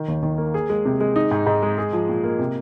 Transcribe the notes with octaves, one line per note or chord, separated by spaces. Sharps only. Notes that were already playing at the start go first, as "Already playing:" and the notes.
Already playing: D#3
D#2
D#3
A#3
G#4
G#3
C3
G#3
D#4
G#2
G#2
G#3
G#4
F3
A#2
A#3
C3